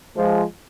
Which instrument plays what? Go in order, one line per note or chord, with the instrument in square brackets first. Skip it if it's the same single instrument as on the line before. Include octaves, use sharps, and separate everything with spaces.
[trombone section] F3 G#3